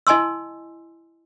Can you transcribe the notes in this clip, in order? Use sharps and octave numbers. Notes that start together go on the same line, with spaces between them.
E4 D#5 G#5 A5 C6 E6